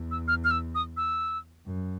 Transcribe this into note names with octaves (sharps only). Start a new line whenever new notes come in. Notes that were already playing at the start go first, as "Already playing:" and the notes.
Already playing: E2
E6
F6
F6
E6
D#6
E6
F#2